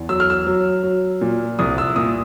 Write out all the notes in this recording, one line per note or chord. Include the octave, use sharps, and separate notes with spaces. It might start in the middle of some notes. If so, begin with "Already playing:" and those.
Already playing: E2
F#3 E6
F6
E6
F#3
F#3
A#2
C2 D#6
E6
A#2 D#6